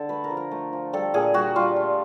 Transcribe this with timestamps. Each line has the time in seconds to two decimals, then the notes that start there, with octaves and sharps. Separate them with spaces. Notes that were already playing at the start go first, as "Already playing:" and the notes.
Already playing: D3 A4
0.09 A3 B4
0.24 A#4
0.31 F3
0.37 A#4
0.51 A3
0.73 F3
0.93 G3 A4
1.14 A#2 G#4
1.34 G3 F#4
1.56 G3 F4
1.76 A3